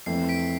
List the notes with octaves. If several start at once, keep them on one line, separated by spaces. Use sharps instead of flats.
F2 E3 A3 C7
B6 D7